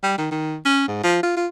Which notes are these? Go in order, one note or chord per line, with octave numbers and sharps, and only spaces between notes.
G3
D#3
D#3
C#4
G#2
F3
F4
F4